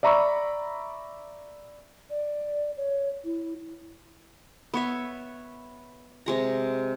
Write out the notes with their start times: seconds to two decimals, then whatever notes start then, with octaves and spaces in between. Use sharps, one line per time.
0.03 D5 E5 A#5 B5 C#6 E6
2.10 D5
2.77 C#5
3.24 E4
4.74 B3 C#5 E5
6.26 C3 G#3 A#5